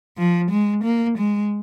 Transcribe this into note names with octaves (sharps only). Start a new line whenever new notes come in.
F3
G#3
A#3
G#3